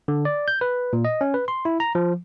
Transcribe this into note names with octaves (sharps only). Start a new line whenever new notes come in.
D3
D5
G6
B4
A#2
D#5
C#4
B4
C6
E4
A#5
F3